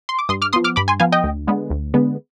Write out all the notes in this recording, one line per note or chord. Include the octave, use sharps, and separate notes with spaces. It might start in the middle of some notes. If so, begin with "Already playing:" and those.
C6
D6
G2 C6 D#6
D6 F6
F3 B3 C6 D#6
D6 F6
G2 B5 D6
G#5 C6
F3 B3 F5 G#5
D#5 G5
D2
D3 G#3 B3
D2
D3 G#3 B3